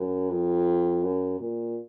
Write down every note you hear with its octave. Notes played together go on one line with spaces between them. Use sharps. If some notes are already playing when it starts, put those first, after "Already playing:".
Already playing: F#2
F2
F#2
A#2